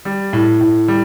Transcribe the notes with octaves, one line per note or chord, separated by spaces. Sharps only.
G3
A2
A2
G3